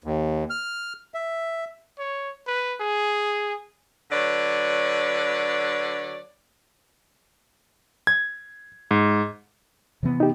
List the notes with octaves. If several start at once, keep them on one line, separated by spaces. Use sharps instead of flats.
D#2
F6
E5
C#5
B4
G#4
D3 F#3 B4 C#5 D5
G#6
G#2
C3 E3 B3
D#4 G4